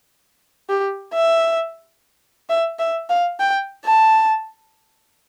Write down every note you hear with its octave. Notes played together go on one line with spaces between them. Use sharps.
G4
E5
E5
E5
F5
G5
A5